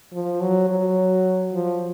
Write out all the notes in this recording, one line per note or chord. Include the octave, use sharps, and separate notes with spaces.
F3
F#3
F#3
F3